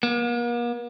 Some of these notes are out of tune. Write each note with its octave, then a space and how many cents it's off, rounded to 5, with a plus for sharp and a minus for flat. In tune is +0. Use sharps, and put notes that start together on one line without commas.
A#3 +40